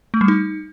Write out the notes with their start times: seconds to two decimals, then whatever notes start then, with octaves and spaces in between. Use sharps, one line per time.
0.14 A3
0.21 G3
0.28 D#4